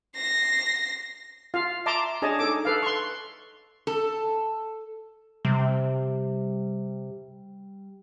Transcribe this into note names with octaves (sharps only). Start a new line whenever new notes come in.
A#6 C7
F4 F5
E5 A5 A#5 C6 D6
D4 G#4 C#5 D#5 G#5 A5
D#4 A4 D6
A4 B4 F5
C6 C#6
A4
C3 G3